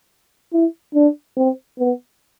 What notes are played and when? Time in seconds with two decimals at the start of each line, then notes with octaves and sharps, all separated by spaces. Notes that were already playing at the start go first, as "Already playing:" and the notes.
0.53 E4
0.94 D4
1.37 C4
1.79 B3